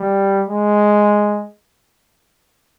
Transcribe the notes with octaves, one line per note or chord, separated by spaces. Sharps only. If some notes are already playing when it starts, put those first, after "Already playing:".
Already playing: G3
G#3